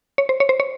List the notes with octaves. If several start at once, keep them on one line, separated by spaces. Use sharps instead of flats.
C#5
C5
C#5
C5
C#5